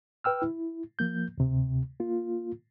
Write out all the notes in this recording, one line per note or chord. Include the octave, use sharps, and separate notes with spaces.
B4 G5 E6 F6
E4
F3 A#3 G6
D2 C3
A#3 F4